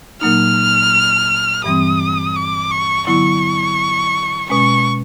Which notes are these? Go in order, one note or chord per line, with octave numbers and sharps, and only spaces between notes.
A#2 F#3 A#3 D#4 F6
G2 E3 G3 C4 D#6
D6
C#6
D3 F#3 B3 E4 C#6
B2 G#3 C#4 C#6